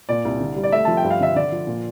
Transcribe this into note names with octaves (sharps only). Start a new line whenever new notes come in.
A#2 D5
C2
D3
G3
D5
A3 E5
F3 A5
G5
G2
F5
D3 E5
D3 D5
F3
A#2